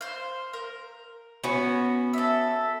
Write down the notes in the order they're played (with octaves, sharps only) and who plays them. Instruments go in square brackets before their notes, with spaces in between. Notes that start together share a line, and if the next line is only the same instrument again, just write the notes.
[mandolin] C5 F5
A#4
[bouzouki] B3 C#4 F#4
[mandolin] A4 E5